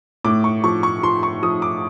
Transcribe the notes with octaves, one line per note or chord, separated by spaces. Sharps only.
A2 D6
C#6
F3 C#6
C#6
F3 C6
C#6
F3 D#6
D6